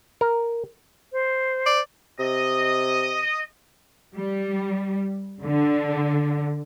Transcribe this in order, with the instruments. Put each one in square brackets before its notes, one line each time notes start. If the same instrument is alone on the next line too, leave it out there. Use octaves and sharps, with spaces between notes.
[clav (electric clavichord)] A#4
[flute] C5
[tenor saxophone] D5
[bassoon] C3 [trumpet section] D#5
[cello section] G3
D3